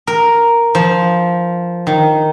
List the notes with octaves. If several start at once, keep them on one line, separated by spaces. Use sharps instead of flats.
A#4
F3
D#3